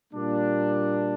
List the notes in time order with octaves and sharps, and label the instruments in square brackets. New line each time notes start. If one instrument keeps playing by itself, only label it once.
[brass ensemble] A#2 G3 A#3 D4